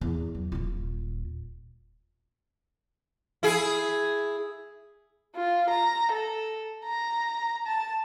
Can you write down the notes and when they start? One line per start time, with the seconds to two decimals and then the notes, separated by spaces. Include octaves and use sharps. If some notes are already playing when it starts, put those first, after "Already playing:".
0.01 E2
0.35 F#3
0.52 D#1 F4
3.43 E4 G#4
5.36 F4
5.69 A#5
6.12 A4
6.85 A#5
7.66 A5